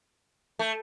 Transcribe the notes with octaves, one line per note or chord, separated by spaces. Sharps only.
A3